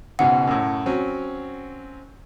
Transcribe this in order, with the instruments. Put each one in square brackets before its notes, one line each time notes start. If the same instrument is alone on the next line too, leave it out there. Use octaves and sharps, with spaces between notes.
[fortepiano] C#2 G#2 B2 [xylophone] F#5
[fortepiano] F#2 A2
F#3 C4 C#4